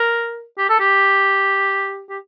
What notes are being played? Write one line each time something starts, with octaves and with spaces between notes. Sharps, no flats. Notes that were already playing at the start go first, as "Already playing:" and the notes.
Already playing: A#4
G4
A4
G4
G4